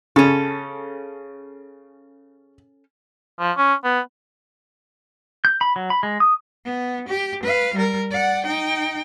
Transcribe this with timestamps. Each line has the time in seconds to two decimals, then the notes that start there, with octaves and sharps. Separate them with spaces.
0.16 C#3 C#4 A4
3.39 F3
3.57 C#4
3.84 B3
5.45 G6
5.61 B5
5.76 F#3
5.90 B5
6.03 G#3
6.20 D#6
6.65 B3
7.08 G4
7.43 B4 F5
7.74 G3 A#4
8.11 D5 F#5
8.44 D#4 G5